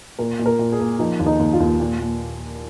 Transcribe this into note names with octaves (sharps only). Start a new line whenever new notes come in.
A#2 A#4
A#2
A#4
A#2
G#4
A#3
F3 D#4
D#2
D#4
D#2
F4
D#2
A#2
A#2